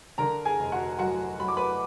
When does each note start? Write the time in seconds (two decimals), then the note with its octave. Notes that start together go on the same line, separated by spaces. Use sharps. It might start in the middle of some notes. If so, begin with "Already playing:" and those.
0.18 D3 A#4 A#5
0.45 G#4 G#5
0.58 F1
0.72 F#4 F#5
0.99 F#3 F#4 F#5
1.39 F#3 B5
1.48 D6
1.57 B4 B5